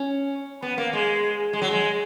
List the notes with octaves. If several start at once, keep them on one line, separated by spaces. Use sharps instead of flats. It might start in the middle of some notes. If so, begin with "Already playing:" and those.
Already playing: C#4
B3
A#3
G#3
G#3
F#3
G#3